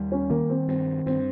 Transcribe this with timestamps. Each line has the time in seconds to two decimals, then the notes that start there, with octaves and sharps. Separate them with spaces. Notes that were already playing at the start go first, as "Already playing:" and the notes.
Already playing: D#2 G3
0.12 C#4
0.30 D#3 A#3
0.49 C4
0.68 G2 C4
1.06 G2 C4